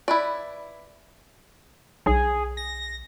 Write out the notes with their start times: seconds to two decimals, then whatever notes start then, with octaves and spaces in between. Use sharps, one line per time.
0.08 E4 B4 D5
2.06 B1 G#4
2.57 A#6